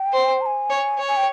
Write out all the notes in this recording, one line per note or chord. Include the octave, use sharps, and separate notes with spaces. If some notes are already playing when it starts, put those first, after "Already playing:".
Already playing: G5
C5
A#5
G#5
C#5
C#5
G#5
G5